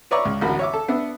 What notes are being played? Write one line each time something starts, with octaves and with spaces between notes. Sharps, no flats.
B4 C#5 D5 E5 A#5 C#6
C#2
A1 D2 F#4 A#4 B5
C#5 E5 D6
A4
B3 D4 E5